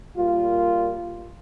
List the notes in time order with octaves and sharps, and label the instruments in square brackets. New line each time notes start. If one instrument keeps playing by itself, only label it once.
[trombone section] A#2 G3 A#3 F4